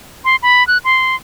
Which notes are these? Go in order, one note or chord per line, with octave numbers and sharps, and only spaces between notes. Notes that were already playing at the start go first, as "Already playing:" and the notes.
C6
B5
F#6
C6